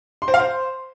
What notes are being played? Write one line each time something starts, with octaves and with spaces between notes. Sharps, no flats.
C6
C5
F5
C5